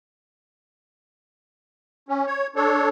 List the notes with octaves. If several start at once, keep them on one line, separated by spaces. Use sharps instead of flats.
C#4
C#5
D4 A4 C#5